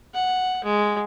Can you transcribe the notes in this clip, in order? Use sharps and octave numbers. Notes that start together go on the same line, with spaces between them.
F#5
G#3